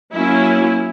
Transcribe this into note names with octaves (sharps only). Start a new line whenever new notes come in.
F#3 A#3 C#4 E4